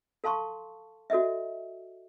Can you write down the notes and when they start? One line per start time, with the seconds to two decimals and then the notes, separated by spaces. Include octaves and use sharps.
0.24 A4 F5 A5 C6 C#6
1.10 F#4 A4 D#5 E5